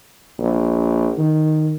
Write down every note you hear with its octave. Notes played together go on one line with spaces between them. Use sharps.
A#1
D#3